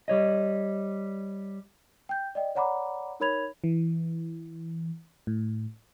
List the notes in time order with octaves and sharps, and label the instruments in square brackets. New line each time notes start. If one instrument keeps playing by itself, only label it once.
[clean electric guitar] G3 C#5 D#5
[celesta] G5 G6
D5 D#5 G5
C#5 D5 F#5 A#5 B5 D6
D#4 A#4 C#5 B5 G#6 F7
[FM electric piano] E3
A2